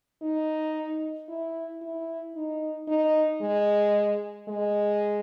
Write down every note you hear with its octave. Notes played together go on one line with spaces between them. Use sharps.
D#4
E4
E4
D#4
D#4
G#3
G#3